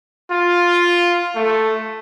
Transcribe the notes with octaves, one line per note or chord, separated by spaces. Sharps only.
F4
A3